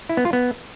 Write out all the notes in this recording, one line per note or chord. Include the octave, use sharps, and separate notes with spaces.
E4
B3
F4
B3